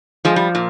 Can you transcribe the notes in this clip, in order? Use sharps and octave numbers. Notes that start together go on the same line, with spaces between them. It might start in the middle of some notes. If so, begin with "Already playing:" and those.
F3 G#3
G3
A#2